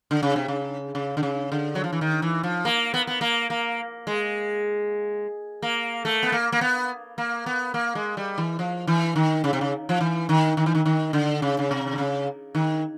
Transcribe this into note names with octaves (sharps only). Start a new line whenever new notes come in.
D3
C#3
C3
C#3
C#3
D3
C#3
D3
F#3
F3
E3
D#3
E3
F3
A#3
B3
B3
A#3
A#3
G#3
A#3
A3
B3
A#3
A#3
B3
A#3
B3
A#3
G#3
G3
E3
F3
E3
D#3
C#3
C3
C#3
F3
E3
D#3
D#3
E3
D#3
D#3
D3
C#3
C#3
C3
D3
C#3
D#3